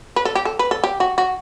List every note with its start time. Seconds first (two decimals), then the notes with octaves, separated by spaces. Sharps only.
0.16 B4
0.25 A4
0.35 G4
0.45 A4
0.59 B4
0.71 A4
0.84 G4
1.00 F#4
1.18 F#4